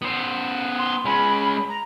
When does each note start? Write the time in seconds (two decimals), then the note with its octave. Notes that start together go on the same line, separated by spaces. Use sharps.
0.02 B3 C5
0.78 C6
1.05 G#3 C#4 B5
1.68 A#5